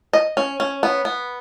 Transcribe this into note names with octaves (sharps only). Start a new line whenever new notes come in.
D#5
C#4
C#4
B3
B3